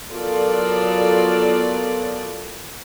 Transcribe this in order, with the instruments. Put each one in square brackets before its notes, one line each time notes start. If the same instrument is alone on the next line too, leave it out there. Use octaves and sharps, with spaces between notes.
[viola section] F#3 B3 F4 A4 A#4 D5